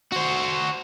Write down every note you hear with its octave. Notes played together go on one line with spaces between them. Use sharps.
F#4 C5